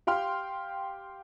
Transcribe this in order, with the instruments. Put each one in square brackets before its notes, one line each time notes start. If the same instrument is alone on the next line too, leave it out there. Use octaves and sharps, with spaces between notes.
[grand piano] G4 F5 G5 C6 F6